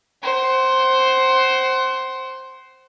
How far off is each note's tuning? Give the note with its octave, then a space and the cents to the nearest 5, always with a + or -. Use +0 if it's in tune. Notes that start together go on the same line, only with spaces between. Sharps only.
C5 +5 F#5 +35